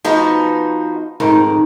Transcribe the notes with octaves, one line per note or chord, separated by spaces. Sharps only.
F3 B3 D#4 F#4
F2 G#2 D#3